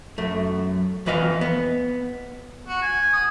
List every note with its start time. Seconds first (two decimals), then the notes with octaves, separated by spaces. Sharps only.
0.18 F#2 A3
1.06 F2 E3 B4 D#5 F5
1.41 B3
2.67 F#4
2.82 G#5
3.13 D#6